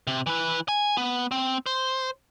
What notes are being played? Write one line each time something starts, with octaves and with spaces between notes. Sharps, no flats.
C3
E3 B4
G#5
B3
C4
C5